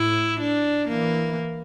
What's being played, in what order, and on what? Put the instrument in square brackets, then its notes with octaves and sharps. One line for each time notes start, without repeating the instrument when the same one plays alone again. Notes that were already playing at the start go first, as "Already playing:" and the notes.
Already playing: [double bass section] A2 [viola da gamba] E4
[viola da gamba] D4
[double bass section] E3 [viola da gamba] A#3